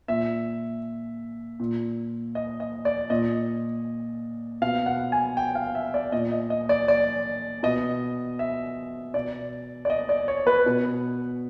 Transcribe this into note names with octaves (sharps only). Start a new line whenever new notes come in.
A#2 E5
A#2
D#5
D#5
D5
A#2 D#5
B2 F5
F#5
G#5
G5
F5
E5
D5
A#2 D#5
D#5
D#5
D5
D5
B2 D#5
E5
B2 D5
D5
D#5
D5
C#5
B4
B2